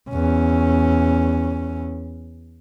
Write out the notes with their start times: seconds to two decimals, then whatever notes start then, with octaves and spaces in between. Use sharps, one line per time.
0.10 E2 C#4